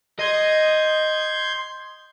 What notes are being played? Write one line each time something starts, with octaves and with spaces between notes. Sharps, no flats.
D#5 C6 G6 G#6